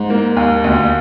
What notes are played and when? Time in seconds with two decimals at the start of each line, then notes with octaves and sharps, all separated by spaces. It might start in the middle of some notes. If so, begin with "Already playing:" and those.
Already playing: G#2
0.10 A#3
0.36 D#2
0.64 D2